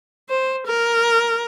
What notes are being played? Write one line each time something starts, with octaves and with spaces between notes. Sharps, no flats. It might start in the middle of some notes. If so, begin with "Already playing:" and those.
C5
A#4